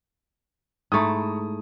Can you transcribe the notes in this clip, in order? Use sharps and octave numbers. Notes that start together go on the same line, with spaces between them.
G#2 A3 E4 A#5 C#6 D#6